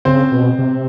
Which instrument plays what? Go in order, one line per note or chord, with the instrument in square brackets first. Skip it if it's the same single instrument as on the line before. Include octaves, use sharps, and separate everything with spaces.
[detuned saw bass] C#3 [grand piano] C4 C5
[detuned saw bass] B2
C3